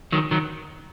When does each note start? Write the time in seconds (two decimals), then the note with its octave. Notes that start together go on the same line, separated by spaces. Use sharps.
0.12 D#3 F#3
0.31 D#3 F#3